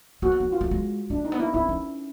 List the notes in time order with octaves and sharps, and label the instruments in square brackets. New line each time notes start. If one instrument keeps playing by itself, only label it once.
[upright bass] A#3 [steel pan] F#4
[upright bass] A3
A#3
[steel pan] F4
[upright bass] A3
G#3
[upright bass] A3 [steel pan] D4
[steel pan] D#4
[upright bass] B3
[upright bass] A#3 [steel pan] E4
[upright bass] C4 [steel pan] E4
[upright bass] C#4